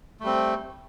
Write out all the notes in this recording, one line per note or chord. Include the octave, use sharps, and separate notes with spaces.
G3 A3 C4